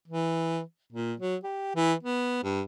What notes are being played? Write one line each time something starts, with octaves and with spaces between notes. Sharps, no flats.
E3
A#2
F#3
G4
E3
B3
G2